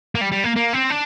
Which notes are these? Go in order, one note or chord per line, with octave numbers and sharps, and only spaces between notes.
A#3
G3
G3
A#3
A#3
C4
D4